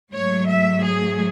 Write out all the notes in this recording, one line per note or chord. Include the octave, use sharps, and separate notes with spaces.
G#2 F#3 A3 C#5
E5
G#4